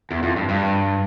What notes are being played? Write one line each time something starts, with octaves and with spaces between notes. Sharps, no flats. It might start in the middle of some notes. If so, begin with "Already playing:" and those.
E2
F2
G2
G2